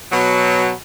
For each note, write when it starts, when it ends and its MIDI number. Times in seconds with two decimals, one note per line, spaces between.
0.12 0.71 47
0.12 0.71 54